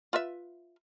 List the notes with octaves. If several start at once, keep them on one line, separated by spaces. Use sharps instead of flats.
F4 B4 E5